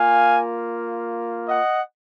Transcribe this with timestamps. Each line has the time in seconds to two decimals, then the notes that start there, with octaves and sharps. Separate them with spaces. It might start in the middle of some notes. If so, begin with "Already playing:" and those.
Already playing: A#3 F4 F5 G#5
1.49 D#5 F#5